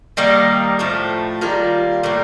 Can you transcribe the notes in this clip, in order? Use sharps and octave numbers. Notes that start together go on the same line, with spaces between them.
D#3 G3 A#3
A2 F3 A3
D#3 G3 A#3 F4
A2 G3 A#3